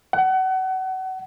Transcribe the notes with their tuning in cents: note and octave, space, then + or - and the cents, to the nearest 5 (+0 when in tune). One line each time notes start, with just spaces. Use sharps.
F#5 +30